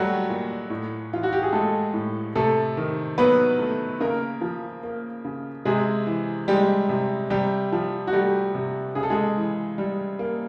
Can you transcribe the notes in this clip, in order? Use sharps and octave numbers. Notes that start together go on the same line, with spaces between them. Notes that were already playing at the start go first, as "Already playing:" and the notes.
Already playing: F#3 G3 A3 F#4 G4
A#2
A2
E3 F4
F#4
G4
G#4
G#3 A3 A4
A2
C3 A3 A4
D#3
F#3 B3 B4
A3
C#3 A#3 A#4
F3
A#3
C#3
C3 G#3 G#4
E3
G3 G#3 G4
C3
C3 G3 G4
F3
F#4
G3 A3 G4
C3
C#3 G#4
A4
G#3 G#4
E3
G3
A#3